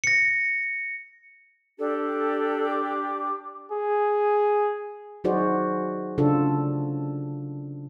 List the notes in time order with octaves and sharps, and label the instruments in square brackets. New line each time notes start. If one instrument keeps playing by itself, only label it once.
[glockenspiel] A#6 C#7
[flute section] D4 G4 [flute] A4
[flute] D6
[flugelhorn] G#4
[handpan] F#3 D#4 F#4 G#4 C5 D5
C#3 D4 F4 A4